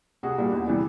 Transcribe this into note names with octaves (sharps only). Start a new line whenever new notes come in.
C2 F#4 G#4
A#2 G3
E2
C3 E3 G3